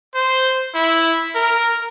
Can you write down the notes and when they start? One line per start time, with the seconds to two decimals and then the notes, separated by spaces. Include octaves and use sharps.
0.15 C5
0.75 E4
1.36 A#4